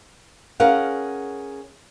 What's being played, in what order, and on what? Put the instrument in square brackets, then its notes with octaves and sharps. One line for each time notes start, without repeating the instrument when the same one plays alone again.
[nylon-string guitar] C#4 G#4 A#4 F5 F#5